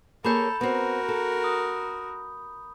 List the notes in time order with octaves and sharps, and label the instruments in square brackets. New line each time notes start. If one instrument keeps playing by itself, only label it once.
[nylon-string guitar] A#3 G#4 C#5 [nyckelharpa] A4 [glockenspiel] A#5 B5 G6
[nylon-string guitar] B3 C4 [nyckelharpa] F#4 A#4
[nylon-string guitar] A4
[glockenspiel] D#6